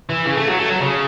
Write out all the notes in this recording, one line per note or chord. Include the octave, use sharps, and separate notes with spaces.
E3
C#3
A3
F#3
A3
F#3
C#3